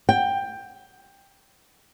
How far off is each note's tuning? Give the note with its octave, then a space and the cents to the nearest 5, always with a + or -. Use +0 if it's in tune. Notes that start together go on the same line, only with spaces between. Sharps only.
G5 +10